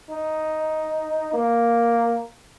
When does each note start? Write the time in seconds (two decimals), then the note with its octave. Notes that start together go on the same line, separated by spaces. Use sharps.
0.10 D#4
1.33 A#3